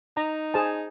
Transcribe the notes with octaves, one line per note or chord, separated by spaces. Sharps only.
D#4 A#5
G#4 C5 A5